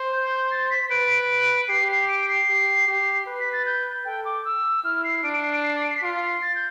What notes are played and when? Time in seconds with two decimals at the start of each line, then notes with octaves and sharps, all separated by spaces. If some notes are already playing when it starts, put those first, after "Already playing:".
Already playing: C5
0.12 G6
0.51 A6
0.70 B6
0.90 B4 D7
1.69 G4 C7
1.88 C7
2.08 D7
2.28 C7
2.48 G4
2.87 G4
3.26 B4
3.40 B6
3.52 A6
3.66 G6
4.05 A4 G5
4.25 D6
4.45 E6
4.84 E4 F6
5.04 C7
5.23 D4 D7
5.33 D7
5.43 C7
5.53 D7
5.63 C7
5.83 D7
5.90 C7
5.98 B6
6.02 F4 C7
6.42 A6
6.55 G6